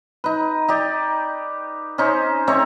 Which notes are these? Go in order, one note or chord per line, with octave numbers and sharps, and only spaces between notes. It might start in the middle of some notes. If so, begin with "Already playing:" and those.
D#4 B4
D#4 G4 D5
C#4 D#4 C5
A3 C4 D#4 C#5